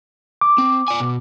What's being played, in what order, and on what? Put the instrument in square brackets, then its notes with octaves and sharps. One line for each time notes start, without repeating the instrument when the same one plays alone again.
[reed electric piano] D6
[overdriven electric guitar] C4
D5 G#5
B2